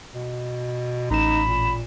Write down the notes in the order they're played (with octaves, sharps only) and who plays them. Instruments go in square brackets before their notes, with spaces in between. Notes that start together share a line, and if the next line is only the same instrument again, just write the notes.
[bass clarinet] B2
[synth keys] A1 E7 [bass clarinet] D#4 [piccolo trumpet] B5
[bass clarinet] A#2